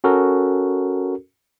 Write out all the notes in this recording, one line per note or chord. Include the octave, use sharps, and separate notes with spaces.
C#4 F#4 A4 A#4